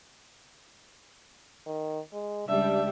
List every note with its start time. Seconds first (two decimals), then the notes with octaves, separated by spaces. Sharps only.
1.66 D#3
2.13 G#3
2.49 C#2 G3 D4 E5